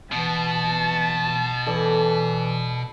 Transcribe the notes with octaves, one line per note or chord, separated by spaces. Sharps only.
B2 E3 A5
E3 A4 B4 D5